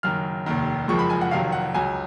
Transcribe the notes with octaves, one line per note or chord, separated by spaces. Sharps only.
F#1 F#2 D#3 F6
F1 D#2 D#3
F#1 F2 F3 G#3 C#6
B5
G#5
F#5
F1 F2 D#3 F#3 F5
F#5
C#2 C#3 F#3 G#5